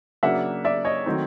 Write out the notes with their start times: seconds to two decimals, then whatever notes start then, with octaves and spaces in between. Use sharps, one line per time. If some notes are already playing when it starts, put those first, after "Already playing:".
0.23 C#3 F#3 A#3 D4 E5 F#5
0.65 D5 E5
0.85 C#5 D#5
1.06 D#3 F#3 A3 C4 D#4